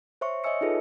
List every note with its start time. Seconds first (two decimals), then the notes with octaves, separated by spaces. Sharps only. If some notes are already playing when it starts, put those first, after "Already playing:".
0.21 C5 C#5 E5 C6 C#6
0.44 C#5 D#5 E5 G#5 E6 C#7
0.61 D#4 F4 G#4 A4 B4